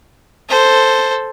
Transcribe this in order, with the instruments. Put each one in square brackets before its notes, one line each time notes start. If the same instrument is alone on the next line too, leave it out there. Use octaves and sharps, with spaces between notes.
[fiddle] A4 C5